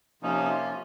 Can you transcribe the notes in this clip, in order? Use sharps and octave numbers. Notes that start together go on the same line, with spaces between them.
C3 F3 A#3 C#4 D#4
D#4
F4